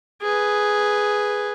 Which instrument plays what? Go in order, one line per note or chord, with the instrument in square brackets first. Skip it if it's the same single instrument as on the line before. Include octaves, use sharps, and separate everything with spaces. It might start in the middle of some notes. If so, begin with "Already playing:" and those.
[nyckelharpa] G#4 B4